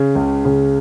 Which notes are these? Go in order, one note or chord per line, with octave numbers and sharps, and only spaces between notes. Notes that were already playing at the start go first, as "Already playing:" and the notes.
Already playing: C#3
C#2
C#3